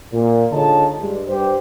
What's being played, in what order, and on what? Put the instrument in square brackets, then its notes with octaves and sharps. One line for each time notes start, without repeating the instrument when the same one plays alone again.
[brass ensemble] A#2
D3 G#3 D#4 F4 C#5 A5
G2 G#3
G2 G4 C5